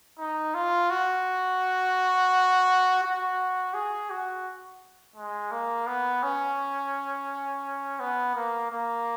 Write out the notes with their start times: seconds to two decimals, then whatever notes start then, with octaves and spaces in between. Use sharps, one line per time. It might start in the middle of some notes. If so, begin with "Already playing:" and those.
0.19 D#4
0.54 F4
0.90 F#4
3.03 F#4
3.74 G#4
4.10 F#4
5.16 G#3
5.51 A#3
5.87 B3
6.23 C#4
8.00 B3
8.35 A#3
8.71 A#3